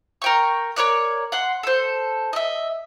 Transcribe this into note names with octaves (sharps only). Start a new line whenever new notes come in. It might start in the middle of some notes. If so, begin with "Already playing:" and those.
A#4 G5 C#6
A#4 C#5 D5 F#6
F#5 C6
A4 C5
D#5 E5